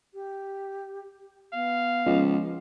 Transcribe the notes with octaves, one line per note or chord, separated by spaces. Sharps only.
G4
B3 F5
C#2 F3 D#5